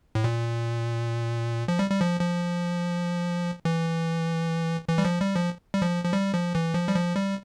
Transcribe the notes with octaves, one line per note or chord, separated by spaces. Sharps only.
A2
A#2
F3
G3
G3
F3
F3
E3
E3
G3
F3
G3
F3
G3
F3
F3
G3
F3
E3
F3
G3
F3
G3